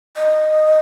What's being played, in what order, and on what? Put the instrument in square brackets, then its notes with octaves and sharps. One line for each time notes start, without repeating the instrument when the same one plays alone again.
[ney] D#5